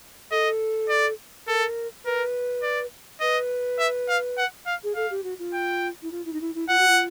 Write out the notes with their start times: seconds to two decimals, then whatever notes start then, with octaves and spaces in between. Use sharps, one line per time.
0.31 A4 D#5
0.89 D5
1.47 A4 A#4
2.04 A#4 B4
2.63 D5
3.20 B4 D#5
3.79 E5
4.08 F5
4.37 F#5
4.66 F5
4.83 G#4
4.95 A4 F5
5.10 G4
5.23 F#4
5.39 F4
5.53 G5
6.02 E4
6.11 F4
6.25 E4
6.33 D#4
6.41 E4
6.54 E4
6.69 F4 F#5
6.78 F#4
6.88 F4